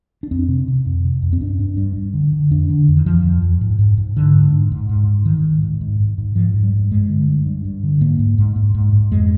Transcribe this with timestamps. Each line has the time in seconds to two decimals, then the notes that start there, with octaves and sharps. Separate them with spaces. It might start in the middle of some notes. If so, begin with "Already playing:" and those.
0.23 D4
0.31 F2 C4
0.48 C3
0.68 C3
0.86 F2
1.04 C3
1.22 F2
1.33 C4
1.41 G2 D4
1.60 G2
1.77 G2
1.96 G2
2.14 D3
2.32 D3
2.50 F2 D4
2.70 D3
2.88 F2
2.97 D#3
3.06 F2 F3
3.24 F2
3.42 F2
3.61 G#2
3.79 G#2
3.98 G#2
4.16 G#2 D3
4.34 G#2
4.53 G#2
4.72 G#2
4.89 G#2
5.08 G#2
5.25 G#2 D#3
5.44 G#2
5.62 G#2
5.81 G#2
6.00 G#2
6.18 G#2
6.35 G#2 F3
6.54 G#2
6.63 G3
6.73 G#2
6.91 G2 G#3
7.09 D3
7.27 G2
7.46 G2
7.65 G2
7.83 D3
8.01 G#2 A#3
8.19 G#2
8.38 G#2
8.56 G#2
8.74 G#2
8.93 G#2
9.11 F2 G#3